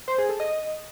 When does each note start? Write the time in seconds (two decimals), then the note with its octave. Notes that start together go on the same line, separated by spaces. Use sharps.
0.08 C5
0.18 G#4
0.29 A4
0.40 D#5